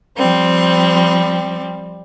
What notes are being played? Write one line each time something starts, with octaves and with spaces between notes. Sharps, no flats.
F3 G3 C4